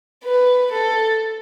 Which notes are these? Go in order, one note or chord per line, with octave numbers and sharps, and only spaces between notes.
B4
A4